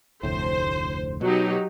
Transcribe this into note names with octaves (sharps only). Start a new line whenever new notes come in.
F1 D2 A2 C5
B2 F#3 D#4 G4